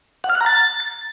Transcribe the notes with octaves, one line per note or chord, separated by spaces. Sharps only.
F#5
F6
F#6
A#5
A6